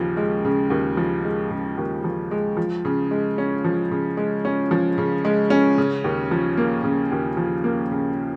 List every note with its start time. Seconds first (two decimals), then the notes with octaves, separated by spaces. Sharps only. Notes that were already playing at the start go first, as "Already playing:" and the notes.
Already playing: D#2 C#3 F3
0.17 G#3
0.45 C#3
0.70 D#2
0.97 F3
1.25 G#3
1.50 C#3
1.77 D#2
2.04 F3
2.31 G#3
2.57 F3
2.85 C#3
3.11 G#3
3.38 C#4
3.65 F3
3.91 C#3
4.17 G#3
4.45 C#4
4.71 F3
4.98 C#3
5.25 G#3
5.50 C#4
5.78 C#3
6.04 D#2
6.31 F3
6.57 A#3
6.84 C#3
7.11 D#2
7.37 F3
7.64 A#3
7.91 C#3